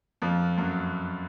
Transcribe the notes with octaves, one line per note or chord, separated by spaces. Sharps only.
F2 F3
F#2 F#3